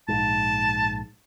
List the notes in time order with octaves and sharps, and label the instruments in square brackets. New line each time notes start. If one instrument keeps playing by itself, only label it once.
[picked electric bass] A#1 G#2 [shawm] A5